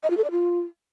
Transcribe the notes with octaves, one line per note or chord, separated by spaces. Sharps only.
D#5
F4
A4
D5
F4